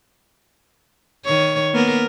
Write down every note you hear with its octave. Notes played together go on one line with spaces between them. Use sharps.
D#3 C#5
A#3 B3 A#4